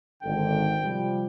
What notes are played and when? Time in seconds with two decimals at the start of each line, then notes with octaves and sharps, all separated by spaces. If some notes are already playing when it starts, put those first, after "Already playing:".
0.23 G#1 D3 G5
0.82 C3 F3 G3